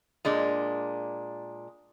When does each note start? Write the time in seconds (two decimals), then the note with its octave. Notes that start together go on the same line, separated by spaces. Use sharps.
0.25 A#2 G#3 D4